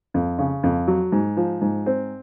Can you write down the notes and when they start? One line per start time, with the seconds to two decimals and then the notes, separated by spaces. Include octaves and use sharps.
0.14 F2
0.39 C#3
0.63 F2
0.88 F#3
1.12 G#2
1.37 F3
1.61 G#2
1.86 C4